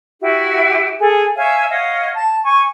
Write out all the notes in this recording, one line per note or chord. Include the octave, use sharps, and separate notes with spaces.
E4 F#4 G4
G#4 A4
C#5 E5 F5 G#5
C#5 D#5 F5 F#5
A5
G#5 C#6